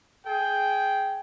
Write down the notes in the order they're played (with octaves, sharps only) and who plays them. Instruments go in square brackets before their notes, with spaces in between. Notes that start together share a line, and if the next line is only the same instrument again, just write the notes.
[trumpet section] G#4 G5